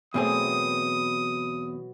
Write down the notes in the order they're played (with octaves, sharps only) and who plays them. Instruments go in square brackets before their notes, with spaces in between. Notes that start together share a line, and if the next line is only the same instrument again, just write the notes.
[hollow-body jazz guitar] E2 C4 G#4 [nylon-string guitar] B2 F#3 A3 [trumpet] D#6